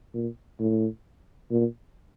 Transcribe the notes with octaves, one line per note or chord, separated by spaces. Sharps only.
A#2
A2
A#2